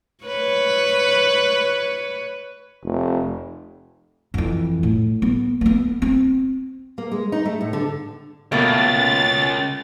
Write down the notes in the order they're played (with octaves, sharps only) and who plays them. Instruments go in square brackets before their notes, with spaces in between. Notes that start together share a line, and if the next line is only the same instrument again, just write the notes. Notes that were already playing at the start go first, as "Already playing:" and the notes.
[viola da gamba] B4 C#5
[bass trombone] F1
[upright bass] F2 E3
A2
B3
A#3 B3
C4
[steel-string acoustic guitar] A#3
G#3
D#4
A3
A2
D3
[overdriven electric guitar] C#2 [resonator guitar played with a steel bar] B2 A3 A#3 [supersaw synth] A6